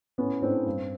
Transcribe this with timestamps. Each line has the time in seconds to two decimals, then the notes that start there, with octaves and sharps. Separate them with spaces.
0.18 A2 B3 C#4
0.42 A2 C4 D4
0.66 G2